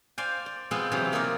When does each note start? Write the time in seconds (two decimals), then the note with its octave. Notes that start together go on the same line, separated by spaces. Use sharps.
0.18 C5 D5 F5 G5 G#5
0.46 D5
0.71 B2 G#3 B3 C4 F4 G5
0.92 C3 E3 F#3 G4 F5
1.12 F#3 A#3 D#4 F4 A#4 D5